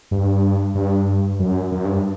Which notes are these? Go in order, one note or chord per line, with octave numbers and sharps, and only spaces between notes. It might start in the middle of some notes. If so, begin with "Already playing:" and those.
G2
G2
F#2
F#2
G2